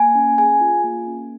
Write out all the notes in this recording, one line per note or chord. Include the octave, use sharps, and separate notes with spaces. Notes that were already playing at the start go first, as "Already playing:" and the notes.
Already playing: A#3 G#5
C#4
G#4 G#5
F4
A#3
C#4